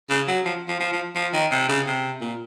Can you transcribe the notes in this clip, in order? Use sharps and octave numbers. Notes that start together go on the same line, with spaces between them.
C#3
F#3
F3
F3
F3
F3
F3
D#3
C3
C#3
C3
A#2